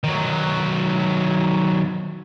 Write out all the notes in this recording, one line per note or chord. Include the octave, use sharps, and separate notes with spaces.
D#3 F#3